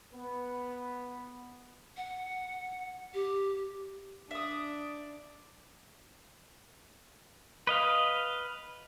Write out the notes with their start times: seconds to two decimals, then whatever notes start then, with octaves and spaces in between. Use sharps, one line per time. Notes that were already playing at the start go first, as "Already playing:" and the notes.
0.13 B3
1.97 F#5
3.14 G4
4.31 D4 E5 D#6
7.67 B4 D#5 F5